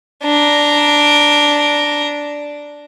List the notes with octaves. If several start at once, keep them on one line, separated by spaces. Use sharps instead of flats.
D4 A#5